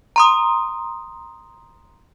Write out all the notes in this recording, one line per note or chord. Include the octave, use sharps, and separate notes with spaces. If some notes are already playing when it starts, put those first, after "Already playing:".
A#5 C6 D#6